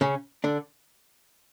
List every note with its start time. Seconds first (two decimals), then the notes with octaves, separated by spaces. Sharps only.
0.01 C#3 C#4
0.44 D3 D4